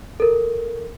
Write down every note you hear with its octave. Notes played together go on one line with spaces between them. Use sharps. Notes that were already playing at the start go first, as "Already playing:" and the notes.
A4 A#4